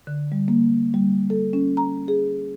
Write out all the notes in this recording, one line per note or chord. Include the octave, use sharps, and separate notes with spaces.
D3
G3
A#3
G3
A4
C#4
A#5
G#4